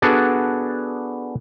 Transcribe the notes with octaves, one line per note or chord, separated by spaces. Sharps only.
B3 D4 F#4 G#4 A4 D5